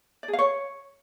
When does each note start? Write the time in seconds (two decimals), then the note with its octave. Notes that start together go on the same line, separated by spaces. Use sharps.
0.23 D5
0.28 G#4
0.33 F5
0.39 C#5